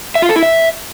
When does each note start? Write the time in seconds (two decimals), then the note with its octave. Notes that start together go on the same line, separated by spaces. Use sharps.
0.15 E5
0.22 F4
0.29 A4
0.36 E4
0.42 E5